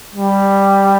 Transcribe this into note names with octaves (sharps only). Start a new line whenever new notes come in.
G3